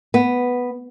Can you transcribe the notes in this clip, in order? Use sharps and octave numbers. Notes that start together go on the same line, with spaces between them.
B3